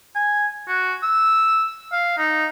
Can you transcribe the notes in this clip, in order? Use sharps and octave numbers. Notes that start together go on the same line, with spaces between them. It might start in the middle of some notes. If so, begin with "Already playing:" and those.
G#5
F#4
E6
F5
D#4